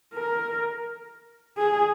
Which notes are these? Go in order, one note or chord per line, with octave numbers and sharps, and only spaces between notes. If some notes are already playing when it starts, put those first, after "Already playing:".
A#4
G#4